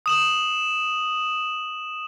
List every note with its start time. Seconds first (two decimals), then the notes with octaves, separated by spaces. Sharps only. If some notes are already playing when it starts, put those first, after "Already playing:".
0.06 D#6 E7 F#7